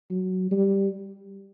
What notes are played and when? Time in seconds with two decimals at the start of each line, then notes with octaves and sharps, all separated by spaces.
0.10 F#3
0.52 G3